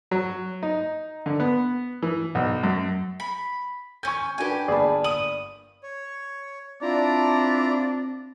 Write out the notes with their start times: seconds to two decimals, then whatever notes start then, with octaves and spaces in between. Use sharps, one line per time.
0.11 F#3
0.63 D#4
1.26 D3
1.40 B3
2.03 E3
2.35 B1
2.63 F#2
3.20 B5
4.03 C#4 G#5 C#6 G6
4.38 D4 F#4 G4 B4 G#5
4.68 G1 A#3 G#4 D5 A5 B5
5.04 D#6 F#7
5.83 C#5
6.82 C4 D4 E4 F4 D5 A#5